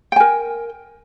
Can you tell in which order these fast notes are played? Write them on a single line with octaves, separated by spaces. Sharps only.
G5 G#5 A#4